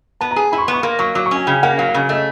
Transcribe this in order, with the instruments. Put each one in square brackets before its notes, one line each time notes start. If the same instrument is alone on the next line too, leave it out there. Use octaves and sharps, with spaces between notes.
[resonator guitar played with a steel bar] B3 [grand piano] A5
[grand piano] A#5
[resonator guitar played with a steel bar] G#4
[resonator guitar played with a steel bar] E4 [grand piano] B5
[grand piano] C#6
C6
[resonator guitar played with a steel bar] B3
[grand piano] C#6
[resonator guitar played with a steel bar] A#3 [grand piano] C6
[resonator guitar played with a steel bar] F#3 [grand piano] C#6
[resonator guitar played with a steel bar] F#3 [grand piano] D6
[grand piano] C#6
[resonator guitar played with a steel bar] C#4 [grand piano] G#5
[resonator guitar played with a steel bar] C#3 [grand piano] G5
[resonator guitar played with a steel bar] A#3 [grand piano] F#5
[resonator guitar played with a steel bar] F#3 [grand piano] F5
[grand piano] F5
[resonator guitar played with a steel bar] C#3
[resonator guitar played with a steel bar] A3 [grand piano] D#5